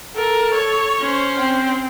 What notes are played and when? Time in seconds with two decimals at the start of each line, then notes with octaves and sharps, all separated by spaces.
0.15 A4 A#4
0.54 C#5
0.99 C#4 C5
1.37 C4